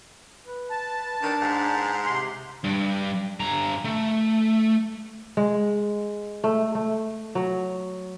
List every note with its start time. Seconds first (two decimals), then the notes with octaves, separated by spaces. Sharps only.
0.45 B4
0.70 A5
1.23 D#3 D4
1.41 G#2
2.06 C3 C6
2.64 G2
3.40 G2 A#5
3.84 A3
5.37 G#3
6.44 A3
6.75 A3
7.35 F#3